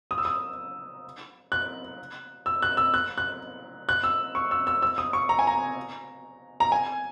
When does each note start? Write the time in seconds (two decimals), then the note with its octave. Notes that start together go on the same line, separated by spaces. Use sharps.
0.11 D#6
0.18 E6
0.25 D#6
1.52 F#6
2.46 E6
2.62 F#6
2.77 E6
2.94 F#6
3.18 F#6
3.89 F#6
4.04 E6
4.35 C#6
4.51 E6
4.67 E6
4.82 E6
4.98 D#6
5.13 C#6
5.29 A#5
5.39 G#5
5.47 A#5
6.60 A#5
6.72 G#5